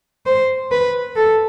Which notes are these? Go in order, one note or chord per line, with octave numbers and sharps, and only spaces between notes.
C5
B4
A4